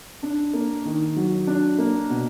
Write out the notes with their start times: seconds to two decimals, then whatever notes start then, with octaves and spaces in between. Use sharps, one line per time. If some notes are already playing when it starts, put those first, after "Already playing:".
0.23 D4
0.54 A#3
0.85 D#3
1.16 F#3
1.47 D4
1.78 A#3
2.10 B2